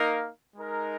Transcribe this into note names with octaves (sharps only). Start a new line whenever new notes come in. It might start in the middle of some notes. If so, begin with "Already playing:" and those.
Already playing: A#3 D#4 A#4 F5
G#3 D#4 A#4